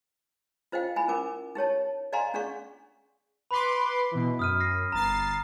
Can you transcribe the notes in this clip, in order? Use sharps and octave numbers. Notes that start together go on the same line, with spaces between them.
F4 C5 D#5 F5 G5
E4 G#5 B5
C#4 A#4 G#5 D6
D#4 G4 C#5 A5
D5 D#5 F5 G#5 A#5 C6
C#4 D4 G#4 D5 F#5 C#6
B4 B5 C6 D6 B6
B2 E3
F#2 D#6 F6 D#7
F6 A#6 C7
G1 A#5 A6 C7